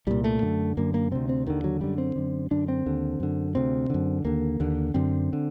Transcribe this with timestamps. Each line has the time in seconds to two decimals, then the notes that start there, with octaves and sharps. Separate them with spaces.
0.07 C2 A#2 G3
0.24 A3
0.42 F#2 D3
0.77 F#2 D3 A#3
0.94 A#3
1.12 D2 C3 C4
1.29 C4
1.47 D#2 D3 D#3
1.64 F#3
1.81 F#2 D3 G3
1.98 C4
2.16 F#2 D3
2.51 F#2 D3 D4
2.68 C4
2.86 D#2 D3
3.20 F#2 D3
3.55 D2 C3 C4
3.90 F#2 D3
4.24 D#2 D3 A#3
4.60 D#2 D3
4.94 F#2 D3 C4
5.33 D3